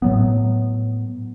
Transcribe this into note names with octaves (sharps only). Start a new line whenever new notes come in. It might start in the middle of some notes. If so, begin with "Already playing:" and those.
A2 F#3 B3